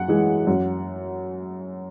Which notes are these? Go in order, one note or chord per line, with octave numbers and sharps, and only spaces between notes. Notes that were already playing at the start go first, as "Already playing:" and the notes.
Already playing: F#2 F#5
E3 G#3
F#2